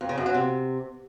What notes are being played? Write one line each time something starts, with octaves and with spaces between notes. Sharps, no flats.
F2
C#3
F#2
F#3
C3